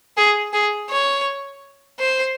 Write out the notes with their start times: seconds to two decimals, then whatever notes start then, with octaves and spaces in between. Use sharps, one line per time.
0.17 G#4
0.53 G#4
0.90 C#5
1.99 C5